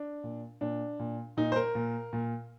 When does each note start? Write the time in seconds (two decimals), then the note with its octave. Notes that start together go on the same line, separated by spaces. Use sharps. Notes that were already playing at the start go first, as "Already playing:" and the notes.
Already playing: D4
0.24 A#2
0.61 A#2 D4
0.99 A#2
1.37 A#2 D#4
1.52 C5
1.56 A#4
1.75 A#2
2.13 A#2